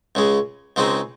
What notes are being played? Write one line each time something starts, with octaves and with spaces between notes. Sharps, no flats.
C#2 C#3 G#3
C#2 C#3 G#3 C4 D#4